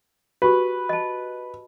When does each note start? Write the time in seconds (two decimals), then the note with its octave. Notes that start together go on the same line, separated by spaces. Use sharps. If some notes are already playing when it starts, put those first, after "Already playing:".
0.42 F#4 G4 B4
0.89 D#5 A5